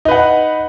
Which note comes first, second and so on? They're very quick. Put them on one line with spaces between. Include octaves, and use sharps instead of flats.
D#4 B4 F#5